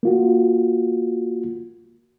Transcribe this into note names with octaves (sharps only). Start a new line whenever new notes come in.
A#3 F4 F#4